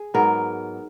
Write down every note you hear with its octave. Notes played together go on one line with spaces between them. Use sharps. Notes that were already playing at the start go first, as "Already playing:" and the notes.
Already playing: G#4
G#2 F#3 B3 A#4